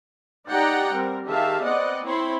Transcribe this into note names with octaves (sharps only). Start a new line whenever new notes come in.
D#4 G4 D5 F#5 G5 A#5
G3 C4 A#4
D#3 G4 G#4 E5 F5 A5
B3 C4 D5 D#5 F#5
C4 E4 C#5 B5 C6